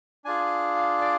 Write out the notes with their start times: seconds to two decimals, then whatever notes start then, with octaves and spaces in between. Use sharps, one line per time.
0.25 D4 F4 G#4 G#5
0.76 F5
1.01 D5